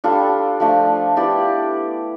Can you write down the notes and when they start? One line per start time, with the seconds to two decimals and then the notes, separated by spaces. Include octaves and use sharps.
0.04 G3 D4 F4 A4
0.60 F3 A3 D4
1.16 B3 E4 G4 D5